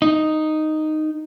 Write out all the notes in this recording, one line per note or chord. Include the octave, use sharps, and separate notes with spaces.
D#4